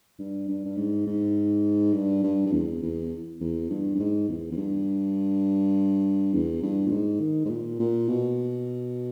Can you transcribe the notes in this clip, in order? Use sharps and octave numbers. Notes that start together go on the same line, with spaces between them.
G2
G2
G2
G#2
G#2
G2
G2
G2
E2
E2
E2
G2
G2
G#2
E2
E2
G2
E2
G2
A#2
G#2
D#3
G#2
A#2
A#2
B2